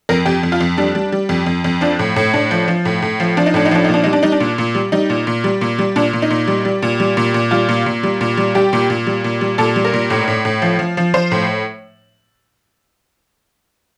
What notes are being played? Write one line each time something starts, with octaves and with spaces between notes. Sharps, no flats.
F2 A#4
F2 G4
F2
F4
F2
G3 D4
G3
G3
F2
F2
F2
F3 D4
A2
A2
A2 D4
F3
F3
A2
A2
F3
F3 D4
D#4
A2 D4
D#4
F3 D4
A#2 D#4
D4
G3 D#4
D4
G3 D#4
D4
A#2
A#2
G3
G3 D#4
A#2
A#2
G3
A#2
G3
A#2 D4
A#2
D#4
A#2
G3
G3
A#2
G3
A#2
A#2
G3 F4
A#2
A#2
G3
A#2
G3
G3 G4
A#2
A#2
G3
A#2
G3
A#2 A4
G3
A#4
A#2
A2
A2
A2
F3
F3
F3
F3 C5
A2